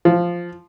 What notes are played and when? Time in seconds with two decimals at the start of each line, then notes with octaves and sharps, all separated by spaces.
0.05 F3